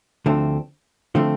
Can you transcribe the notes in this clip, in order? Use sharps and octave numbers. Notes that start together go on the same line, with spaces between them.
D2 D3 F3 A3 C4
D3 F3 A3 C4